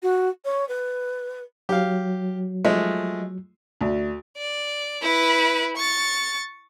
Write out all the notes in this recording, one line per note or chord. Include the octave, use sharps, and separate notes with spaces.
F#4
C#5
B4
F#3 G4 F5
F3 G#3 A3
D2
D5
E4 B4
C#6 A6